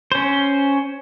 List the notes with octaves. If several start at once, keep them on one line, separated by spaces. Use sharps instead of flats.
C#4 C5